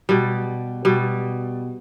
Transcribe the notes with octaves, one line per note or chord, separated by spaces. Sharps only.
B2 G3
B2 G3